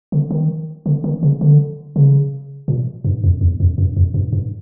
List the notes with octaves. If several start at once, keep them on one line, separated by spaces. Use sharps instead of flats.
D3
D#3
D3
D#3
C#3
D3
C#3
A#2
G2
F2
E2
F2
F#2
F2
G2
G2